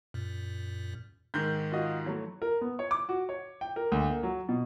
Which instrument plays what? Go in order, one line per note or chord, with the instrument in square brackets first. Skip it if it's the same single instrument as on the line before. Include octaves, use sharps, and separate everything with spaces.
[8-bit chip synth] F#2 A#2
[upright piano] G#2 D#3 [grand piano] G6
[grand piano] F4 F#4 D#5
E3 F#3 A3
A#4
B3
C#5
D6
F#4
C#5
G5
A#4
D2
A#3
F#3
B2